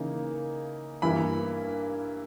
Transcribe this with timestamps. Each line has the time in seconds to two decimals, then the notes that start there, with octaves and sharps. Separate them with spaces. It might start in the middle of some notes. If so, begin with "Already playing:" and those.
Already playing: C#3 E3 A#3 D#4
1.02 G2 E3 A#3 E4 B5